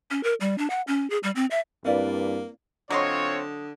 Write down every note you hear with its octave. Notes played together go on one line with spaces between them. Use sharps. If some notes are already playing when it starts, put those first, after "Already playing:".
C#4
A#4
G3
D4
F#5
C#4
G#4
G3
C4
E5
G2 A#3 C4 E4 B4 D5 F5
D3 F#3 C4 F4 C#5 D#5 C6